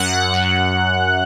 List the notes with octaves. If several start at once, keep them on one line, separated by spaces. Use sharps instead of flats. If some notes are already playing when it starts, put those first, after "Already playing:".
Already playing: F#2 F#5 F#6
F#2